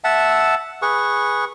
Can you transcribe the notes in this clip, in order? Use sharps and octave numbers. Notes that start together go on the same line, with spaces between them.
E5 F#5 A5 E6
G#4 B4 C#6